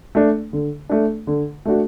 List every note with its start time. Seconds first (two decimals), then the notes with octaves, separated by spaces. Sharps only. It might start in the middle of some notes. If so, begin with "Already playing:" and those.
0.15 A3 D4
0.53 D3
0.89 A3 D4
1.27 D3
1.66 A3 D4 F#4